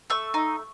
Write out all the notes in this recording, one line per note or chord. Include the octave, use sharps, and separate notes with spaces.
A3 C#6 E6
D#4